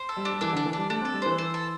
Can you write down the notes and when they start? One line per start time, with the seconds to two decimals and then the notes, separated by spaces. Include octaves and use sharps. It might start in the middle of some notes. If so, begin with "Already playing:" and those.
Already playing: C5
0.09 A4
0.17 G3
0.25 D4
0.32 G3
0.41 E3 D4
0.53 D3
0.57 D4
0.66 E3
0.73 G3 D4
0.90 A3 D4
1.01 C4
1.05 A4
1.13 G3
1.22 E3 C5
1.38 C5
1.54 A4